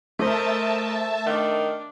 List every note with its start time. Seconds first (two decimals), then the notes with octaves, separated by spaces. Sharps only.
0.19 A3 A#4 C5 D#5 E5 A5
1.26 D#3 D4